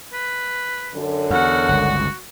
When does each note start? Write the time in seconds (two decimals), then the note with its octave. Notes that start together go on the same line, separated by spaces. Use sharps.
0.13 B4
0.95 F#2 D3
1.30 E2 F#4 F#5
1.69 G1 C#2